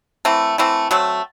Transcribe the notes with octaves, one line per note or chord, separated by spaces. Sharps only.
E3 A3 C4
E3 A3 C4
F#3 A3 C4